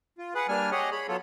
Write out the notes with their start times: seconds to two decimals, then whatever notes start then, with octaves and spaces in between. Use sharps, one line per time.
0.18 F4
0.35 G#4 B4 F#5
0.49 G3 A#3 D4 G#5 F6
0.71 G4 G#4 C#5 D#5 F#5
0.91 G#4 C#5 B5
1.08 F#3 B3 F4 A4 C#5